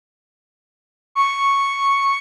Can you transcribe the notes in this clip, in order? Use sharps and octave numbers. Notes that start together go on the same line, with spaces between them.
C#6